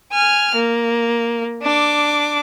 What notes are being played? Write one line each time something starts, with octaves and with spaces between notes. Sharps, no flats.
G#5 F6
A#3
D4 D6